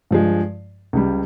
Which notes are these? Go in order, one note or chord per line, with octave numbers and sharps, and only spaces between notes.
G2 F3 G#3
C#2 C#3 G3